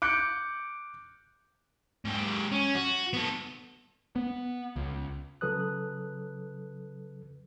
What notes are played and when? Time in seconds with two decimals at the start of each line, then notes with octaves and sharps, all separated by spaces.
0.02 D6 F#6 G6 C#7 D7
2.05 G#2 G4
2.52 C#4
2.75 F#4
3.13 B3 A4
4.16 B3
4.76 C#2
5.41 C#3 F#3 A4 B4 D#6 F#6